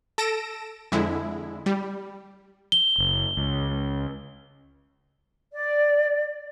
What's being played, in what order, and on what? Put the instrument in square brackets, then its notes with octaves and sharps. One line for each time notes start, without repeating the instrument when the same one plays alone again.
[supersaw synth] A4 A#6 D7 E7
F2 D3 G#3 E4
G3
[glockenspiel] G7
[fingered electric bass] F#1
C#2
[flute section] D5